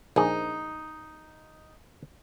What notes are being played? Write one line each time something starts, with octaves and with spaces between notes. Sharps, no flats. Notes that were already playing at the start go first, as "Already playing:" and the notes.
A#1 D#4 G#4